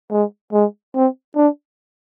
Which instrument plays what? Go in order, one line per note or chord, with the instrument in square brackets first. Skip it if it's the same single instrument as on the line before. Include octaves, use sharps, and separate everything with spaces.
[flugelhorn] G#3
G#3
C4
D4